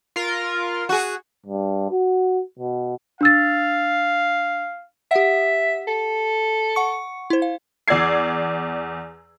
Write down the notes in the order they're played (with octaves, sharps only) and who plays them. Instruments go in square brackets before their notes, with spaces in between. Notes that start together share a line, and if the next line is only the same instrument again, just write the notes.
[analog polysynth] F4 A#4
[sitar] F#4 G#4
[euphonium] G2
F#4
B2
[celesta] D4 E6 A6 [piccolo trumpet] F5
[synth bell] G4 F#5 [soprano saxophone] E5
[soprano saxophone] A4
[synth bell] F#5 C#6 C#7
E4 C5
F5
[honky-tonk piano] E2 D5 E6 G#6 C7